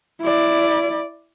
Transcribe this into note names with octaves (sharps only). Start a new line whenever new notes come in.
E4 D5